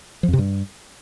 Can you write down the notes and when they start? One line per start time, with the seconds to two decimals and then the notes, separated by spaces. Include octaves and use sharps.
0.23 F3
0.28 F2
0.33 C3
0.38 G2